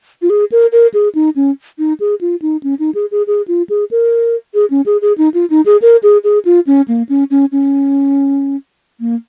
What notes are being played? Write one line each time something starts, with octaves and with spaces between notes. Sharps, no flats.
F4
G#4
A#4
A#4
G#4
D#4
C#4
D#4
G#4
F4
D#4
C#4
D#4
G#4
G#4
G#4
F4
G#4
A#4
G#4
C#4
G#4
G#4
D#4
F4
D#4
G#4
A#4
G#4
G#4
F4
C#4
A#3
C#4
C#4
C#4
A#3